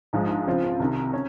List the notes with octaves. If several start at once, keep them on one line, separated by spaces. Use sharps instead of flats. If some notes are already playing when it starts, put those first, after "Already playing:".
A#1 G#2 F3 G#3
C#2 C#3 F3 C4 F4
C2 C3 D#3
C#4